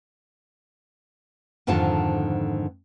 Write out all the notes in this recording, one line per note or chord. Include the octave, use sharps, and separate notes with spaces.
F2 G#2 D3 D#3 F4 A5